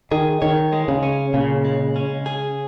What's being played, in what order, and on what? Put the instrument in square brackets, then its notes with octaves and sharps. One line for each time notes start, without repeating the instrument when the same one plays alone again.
[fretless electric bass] D#3 [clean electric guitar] G#4
[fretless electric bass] D#3 [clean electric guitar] C#5
[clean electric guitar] G#3
[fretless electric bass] C#3
[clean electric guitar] C#4
[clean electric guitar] A#2 [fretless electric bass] C#3
[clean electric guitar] G#3
C#4
G#4